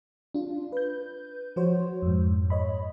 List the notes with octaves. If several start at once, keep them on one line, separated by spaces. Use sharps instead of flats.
D4 F4
B4 G6
F3 F#4 C5 C#5
F2 G#2
C#5 D#5 B5